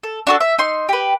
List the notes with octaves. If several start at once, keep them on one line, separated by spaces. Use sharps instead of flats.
A4
D4 F#4 A4
E5
D#4 C6
G4 B4